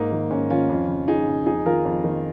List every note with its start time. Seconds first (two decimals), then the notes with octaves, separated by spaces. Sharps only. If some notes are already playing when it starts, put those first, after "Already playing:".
Already playing: G#2 A#3 D#4
0.12 D#3
0.30 G#2 C#4
0.50 D#3 C#4 F4
0.69 F2
0.88 C#3
1.08 F2 D#4 G#4
1.27 C#3
1.46 F2 D#4 G#4
1.66 D#3 F4 A#4
1.85 F2
2.04 D#3